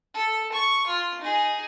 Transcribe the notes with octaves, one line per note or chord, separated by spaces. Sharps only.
A4
C#6
F4
D#4 G#4